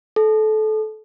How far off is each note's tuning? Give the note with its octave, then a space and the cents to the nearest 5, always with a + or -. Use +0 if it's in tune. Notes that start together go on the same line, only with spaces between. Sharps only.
A4 -25